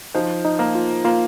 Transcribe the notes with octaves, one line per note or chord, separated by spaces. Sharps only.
F3 D#4
D#4
A#3
F4
A#3 F4